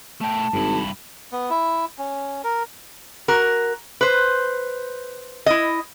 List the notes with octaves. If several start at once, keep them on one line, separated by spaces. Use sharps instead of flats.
A3 G5 A5
G#1 G2 E4
B3
E4
C#4
A#4
F#4 A#4
B4 C5
E4 D#5